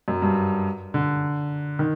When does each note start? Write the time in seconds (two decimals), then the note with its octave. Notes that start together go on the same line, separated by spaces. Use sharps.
0.08 F#2
0.22 G2
0.94 D3
1.79 D#3